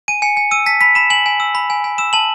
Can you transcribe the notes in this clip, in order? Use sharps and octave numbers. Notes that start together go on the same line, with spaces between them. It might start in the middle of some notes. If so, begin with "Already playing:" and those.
G#5 D#7
G#5 C#7
G#5 C#7
E6 D#7
A5 B6
B5 B6
B5 E7
G#5 F#7
G#5
E6
B5
G#5
G#5
E6 E7
A5 F#7